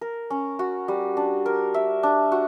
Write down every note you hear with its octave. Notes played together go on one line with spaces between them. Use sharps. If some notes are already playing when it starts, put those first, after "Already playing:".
A#4
C#4
F#4
G3
D4
A#4
E5
D4
F#4